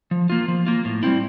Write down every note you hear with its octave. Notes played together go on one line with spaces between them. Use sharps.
F3
A#3 F4
F3
A#3 F4
A2
G3 C4 E4